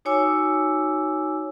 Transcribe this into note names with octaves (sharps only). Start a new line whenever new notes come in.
D#4 F#4 C#5 G#5 D6 E6